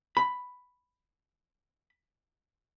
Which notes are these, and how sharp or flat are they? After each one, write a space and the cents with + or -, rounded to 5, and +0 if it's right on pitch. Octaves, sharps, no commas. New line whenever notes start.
B5 +5